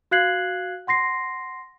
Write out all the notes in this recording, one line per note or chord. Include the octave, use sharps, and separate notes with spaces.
F#4 F5 F#6 G#6 C7 F#7
F#5 C6 A#6 C7